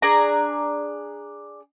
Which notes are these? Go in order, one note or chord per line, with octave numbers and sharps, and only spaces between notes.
D4 G#4 A#5